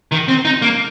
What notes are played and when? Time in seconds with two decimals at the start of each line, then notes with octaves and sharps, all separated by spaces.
0.12 D#3
0.28 C4
0.45 D#4
0.62 A#3